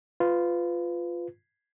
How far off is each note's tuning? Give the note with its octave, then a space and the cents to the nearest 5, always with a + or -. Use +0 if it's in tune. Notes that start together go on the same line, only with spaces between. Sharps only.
F4 +0 B4 +25